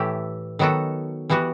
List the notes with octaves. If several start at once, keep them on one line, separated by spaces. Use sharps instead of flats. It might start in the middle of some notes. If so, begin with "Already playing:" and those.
Already playing: A2 E3 A3 E4 G4
D#3 F#3 B3 F#4 A4
E3 G3 B3 F#4